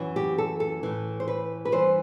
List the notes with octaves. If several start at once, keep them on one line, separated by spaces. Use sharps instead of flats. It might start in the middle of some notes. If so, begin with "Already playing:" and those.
Already playing: F#2 E3
G4
A4
A4
A2 E3
C5
B4
B4
G2 E3 C5